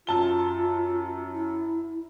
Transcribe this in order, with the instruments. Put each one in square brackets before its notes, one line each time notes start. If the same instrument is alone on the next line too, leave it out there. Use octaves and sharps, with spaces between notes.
[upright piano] F#2 A5 G7 [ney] F4
[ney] E4